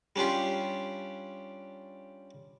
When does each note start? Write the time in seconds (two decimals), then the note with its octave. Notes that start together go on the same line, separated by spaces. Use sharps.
0.16 G3 C#4 D4 F4 G4